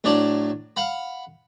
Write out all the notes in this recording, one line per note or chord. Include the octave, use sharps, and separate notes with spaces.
A2 F#3 D4 D5 A5
F5 F#5 B5